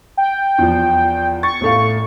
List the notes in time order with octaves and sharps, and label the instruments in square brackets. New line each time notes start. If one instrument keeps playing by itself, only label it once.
[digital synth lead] G5
[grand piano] E2 F3
[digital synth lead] C#6 [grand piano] A6
[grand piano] A1 A3 F5